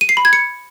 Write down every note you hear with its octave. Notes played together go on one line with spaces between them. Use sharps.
D#7
C7
B5
G#6
C#7